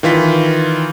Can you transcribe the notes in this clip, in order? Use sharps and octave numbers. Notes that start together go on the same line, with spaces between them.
D#3 E3 F4 B6